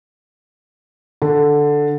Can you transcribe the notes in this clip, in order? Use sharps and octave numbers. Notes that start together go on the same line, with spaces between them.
D3